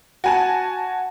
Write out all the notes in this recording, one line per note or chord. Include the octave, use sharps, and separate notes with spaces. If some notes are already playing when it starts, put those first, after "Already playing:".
F#4 G#5 A5